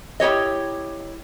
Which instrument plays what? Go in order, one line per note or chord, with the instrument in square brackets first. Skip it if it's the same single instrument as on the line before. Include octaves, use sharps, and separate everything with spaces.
[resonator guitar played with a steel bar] E4 G4 C#5 D#5